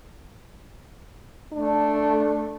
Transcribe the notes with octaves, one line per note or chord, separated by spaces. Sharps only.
A3 D4